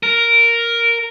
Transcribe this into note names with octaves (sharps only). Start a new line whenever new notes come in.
A#4